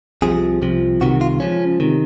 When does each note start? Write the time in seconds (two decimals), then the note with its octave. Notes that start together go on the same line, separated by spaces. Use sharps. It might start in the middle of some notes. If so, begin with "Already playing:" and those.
0.22 C2 C3 F3 G#4
0.62 C2 C3 F3
1.01 C2 C3 D#3 F#4
1.21 F4
1.40 C#2 C#3 F3 C#4
1.80 C3 D#3